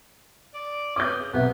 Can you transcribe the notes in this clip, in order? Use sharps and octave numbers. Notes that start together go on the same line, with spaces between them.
D5
C#4 D6 D#6 G6
C#3
B1 C3 B3 E5